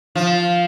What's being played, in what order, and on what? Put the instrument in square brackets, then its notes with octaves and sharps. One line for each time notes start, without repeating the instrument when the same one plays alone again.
[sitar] F3